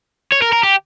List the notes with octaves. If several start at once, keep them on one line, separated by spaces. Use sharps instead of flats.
C#5
A#4
A#4
G4